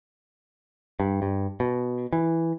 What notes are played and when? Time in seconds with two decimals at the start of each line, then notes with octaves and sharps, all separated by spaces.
1.00 G2
1.22 G2
1.60 B2
2.13 E3